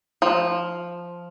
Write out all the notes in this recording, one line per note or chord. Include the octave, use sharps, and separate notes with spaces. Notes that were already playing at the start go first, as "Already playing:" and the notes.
F3